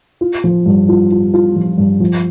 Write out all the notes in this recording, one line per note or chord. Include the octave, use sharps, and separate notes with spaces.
F4
F3
G2
F4
F4
F4
F3
G2
F3